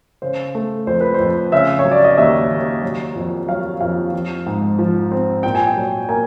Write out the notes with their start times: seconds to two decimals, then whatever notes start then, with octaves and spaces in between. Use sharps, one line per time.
0.22 C#3 C5
0.55 A3
0.87 F2 C5
1.01 B4
1.14 C5
1.20 F2
1.52 C#3 E5
1.79 C#5
1.85 F#3
1.91 D5
2.04 D#5
2.17 D#2 E5
2.50 D#2
2.83 F#3
3.15 F2
3.48 F#3 F5
3.81 F2 F5
4.13 F3
4.46 G#2
4.79 F3
5.11 C4
5.43 A#2 G5
5.55 G#5
5.67 G5
5.76 F#3
6.09 A#3 G#5